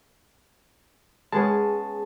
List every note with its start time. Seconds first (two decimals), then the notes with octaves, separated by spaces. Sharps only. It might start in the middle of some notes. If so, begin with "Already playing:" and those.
1.32 G#3 B3 C#4 G#4 A5